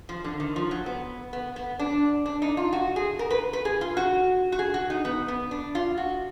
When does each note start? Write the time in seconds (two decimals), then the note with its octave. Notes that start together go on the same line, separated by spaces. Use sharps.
0.09 F3
0.24 D3
0.40 D#3
0.56 F3
0.71 F#3
0.86 B3
1.33 B3
1.56 B3
1.79 D4
2.26 D4
2.42 D#4
2.57 F4
2.73 F#4
2.96 G#4
3.19 A#4
3.30 B4
3.53 B4
3.65 G#4
3.81 F4
3.97 F#4
4.52 F#4
4.59 G#4
4.74 F#4
4.90 D#4
5.05 B3
5.28 B3
5.51 D4
5.75 F4
5.97 F#4